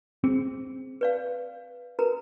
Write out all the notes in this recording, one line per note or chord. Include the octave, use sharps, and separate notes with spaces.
C4 G#4
B4 D5 F5
A#4 B4 A#5